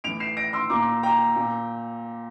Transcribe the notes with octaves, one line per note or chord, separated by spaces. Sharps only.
A2 E3 D7 F7
C7 E7
A#6 D7
C6 E6
A#2 A#5 D6
G5 A#5
A#2